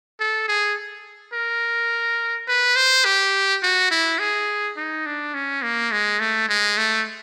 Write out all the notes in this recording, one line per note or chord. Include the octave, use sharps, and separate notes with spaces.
A4
G#4
A#4
B4
C5
G4
F#4
E4
G#4
D#4
D4
C#4
A#3
G#3
A3
G#3
A3